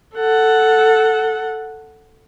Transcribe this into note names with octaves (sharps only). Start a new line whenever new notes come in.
A4 F#5